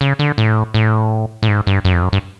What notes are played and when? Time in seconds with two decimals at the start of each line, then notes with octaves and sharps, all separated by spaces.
0.01 C#3
0.19 D3
0.38 A2
0.74 A2
1.43 A2
1.48 G#2
1.67 G2
1.85 F#2
1.93 F2
2.03 F#2
2.13 G2